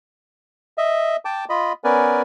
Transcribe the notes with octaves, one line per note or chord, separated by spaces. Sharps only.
D#5 E5
G5 A5 D6
F4 D#5 B5
B3 C#4 A#4 B4 D5 G#5